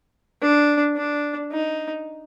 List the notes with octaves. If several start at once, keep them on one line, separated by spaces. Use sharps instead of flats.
D4
D4
D#4